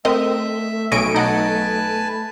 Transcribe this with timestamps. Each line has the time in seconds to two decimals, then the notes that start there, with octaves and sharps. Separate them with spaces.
0.05 A3 C4 A#4 D#5 E5
0.92 B1 D#5 G#5 C#6 D7
1.15 D#4 B4 D#5 F#5 G#5 A5